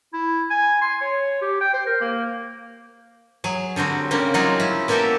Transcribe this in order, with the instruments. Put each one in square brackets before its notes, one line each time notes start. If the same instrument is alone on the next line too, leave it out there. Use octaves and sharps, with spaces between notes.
[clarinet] E4
G#5
C6
C#5
G4
G5
C5
A#4
A#3
[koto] F#3 G#4
D3 G3 C4 F#4
C#3 G3 A#3 C4
F#3 G3 D#4 F4 F#4 G#4
C#4 E4
A#3 B3 E4 G4 A4 A#4